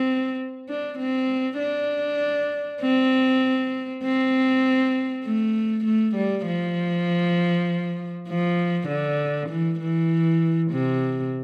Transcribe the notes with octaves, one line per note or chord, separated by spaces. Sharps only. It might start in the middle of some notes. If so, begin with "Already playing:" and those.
Already playing: C4
D4
C4
D4
C4
C4
A3
A3
G3
F3
F3
D3
E3
E3
C3